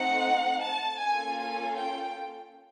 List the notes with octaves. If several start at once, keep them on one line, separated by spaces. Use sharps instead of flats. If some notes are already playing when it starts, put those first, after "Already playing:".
Already playing: A3 C4 D#4 F#5
A5
A#3 C#4 F4 A4 G#5
G#5
G5